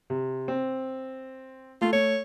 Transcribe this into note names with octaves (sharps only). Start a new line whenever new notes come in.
C3
C4
A3 F4
A3 C#5